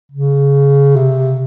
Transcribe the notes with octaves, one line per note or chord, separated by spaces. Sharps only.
C#3
C3